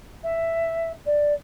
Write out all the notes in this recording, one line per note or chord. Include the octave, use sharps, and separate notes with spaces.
E5
D5